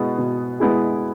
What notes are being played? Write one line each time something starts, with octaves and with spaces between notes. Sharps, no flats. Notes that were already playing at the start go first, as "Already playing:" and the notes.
Already playing: B2 G#3 B3 E4 G#4
B2
G#3 B3 E4 G#4